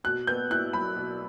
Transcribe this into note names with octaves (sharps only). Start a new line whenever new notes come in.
B2 F#6
B3 G6
E4 F#6
F#3 B5
B2